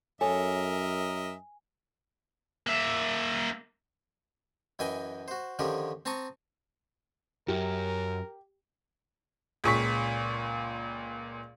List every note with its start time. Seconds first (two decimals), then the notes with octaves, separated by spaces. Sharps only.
0.21 F#2 A4 A#4 C#5 D#5 E5 G#5
2.67 A#3 E5
4.79 F#2 E3 E4 D#5 G5 G#5
5.28 F#4 C5
5.59 D3 D#3 F3 C#4 G4 A#4
6.05 C4 A5 A#5 C#6 D#6
7.48 F#2 G4 A#4
9.64 C#2 A#2 C#6 B6